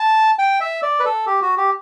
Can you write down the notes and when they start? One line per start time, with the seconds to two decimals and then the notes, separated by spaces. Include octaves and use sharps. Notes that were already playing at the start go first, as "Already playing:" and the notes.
Already playing: A5
0.39 G5
0.61 E5
0.82 D5
1.00 B4
1.05 A4
1.27 G4
1.42 F#4
1.57 G4